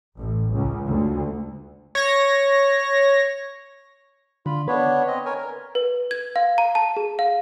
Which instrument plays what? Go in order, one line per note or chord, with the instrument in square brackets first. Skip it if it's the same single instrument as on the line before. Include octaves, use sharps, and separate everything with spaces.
[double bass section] A1
C#2
D2
[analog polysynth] C#5 A#6
[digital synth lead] D3 [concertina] F4 B5
[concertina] B3 D4 C#5 [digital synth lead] B4
[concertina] C4 D#5
A#4 C#5 G#5
A#4
[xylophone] B4
G#6
F5
A#5
A5
G#4
F5